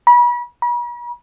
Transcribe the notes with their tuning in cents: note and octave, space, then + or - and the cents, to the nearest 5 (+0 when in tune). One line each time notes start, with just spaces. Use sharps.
B5 -35
B5 -45